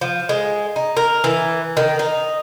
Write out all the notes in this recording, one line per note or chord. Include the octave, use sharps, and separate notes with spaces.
F3
G#3
D#4
A#4
E3
D#3
D#4